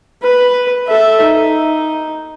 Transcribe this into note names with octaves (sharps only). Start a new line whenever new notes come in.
B4
A4 E5
D#4